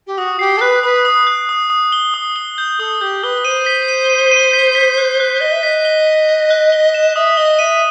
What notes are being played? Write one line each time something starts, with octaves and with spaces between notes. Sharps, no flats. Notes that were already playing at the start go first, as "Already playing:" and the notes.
G4
F#4 D#6
G4 C7
A4
B4 F#6
B4 D#6
D#6
F#6
D#6
D#6
G7
D#6
G7
G6
A4 D#6
G4 G6
B4 G7
C5 D#7
B6
D#7
D#7
D#7
B6
B6
F#6
F#6
D#5 G7
E5
D#5 B6
G7
B6
G7
F#6
G7
E7
E5 D#6
D#5 G7
E5 D#7